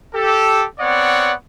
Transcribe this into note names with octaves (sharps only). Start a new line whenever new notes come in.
G4 A4
B3 C4 C#5 D5 F#5